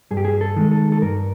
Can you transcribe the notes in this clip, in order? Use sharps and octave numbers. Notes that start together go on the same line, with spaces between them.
G2 G#4
G4
G#4
A4
D#3 G#3
A4
A4
G2 A#4